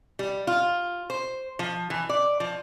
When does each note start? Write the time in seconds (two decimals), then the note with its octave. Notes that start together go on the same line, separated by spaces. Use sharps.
0.19 G3
0.47 F4
1.10 C5
1.59 F3
1.90 E3
2.09 D5
2.40 F3